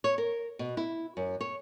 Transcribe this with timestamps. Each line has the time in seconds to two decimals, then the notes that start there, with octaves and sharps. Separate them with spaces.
0.04 C#5
0.18 A#4
0.59 B2
0.77 E4
1.17 F#2
1.41 C#5